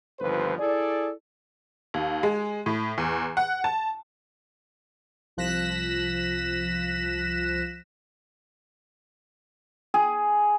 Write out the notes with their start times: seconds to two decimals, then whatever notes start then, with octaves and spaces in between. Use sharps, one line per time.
0.20 G1 D#2 F3 B4 C5
0.59 E4 G#4 A4 D5
1.94 D#2
2.23 G#3
2.66 A2
2.98 E2
3.37 F#5
3.64 A5
5.37 C2 F3 F#6 A#6 B6 E7
9.94 G#4